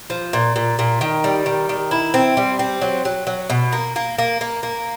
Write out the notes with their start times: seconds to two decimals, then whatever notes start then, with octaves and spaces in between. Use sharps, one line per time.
0.10 F3
0.33 A#2
0.56 A#2
0.79 A#2
1.01 D#3
1.24 G3
1.46 D#3
1.69 D#3
1.91 E4
2.14 C4
2.37 G3
2.59 C4
2.82 F#3
3.05 F#3
3.27 F#3
3.50 B2
3.73 A#3
3.96 A#3
4.18 A#3
4.41 A#3
4.63 A#3